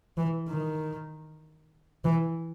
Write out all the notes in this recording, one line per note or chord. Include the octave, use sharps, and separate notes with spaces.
E3
D#3
E3